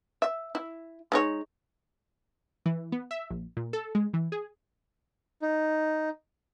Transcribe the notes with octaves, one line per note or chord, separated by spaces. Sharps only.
E5
E4
G#3 D#4 C#5
E3
B3
E5
A#1
A#2
A4
G#3
E3
G#4
D#4